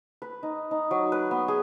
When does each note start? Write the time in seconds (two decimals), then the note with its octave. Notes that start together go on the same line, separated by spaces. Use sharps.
0.22 B4
0.43 D#4
0.71 D#4
0.91 F#3
1.12 B4
1.31 B3
1.48 G#4